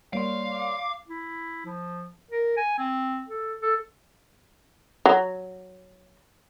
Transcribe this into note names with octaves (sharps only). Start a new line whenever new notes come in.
G3 A#3 C#5 D5 F5 C6
D6
E4
F3
A#4
G#5
C4
A4
A4
F#3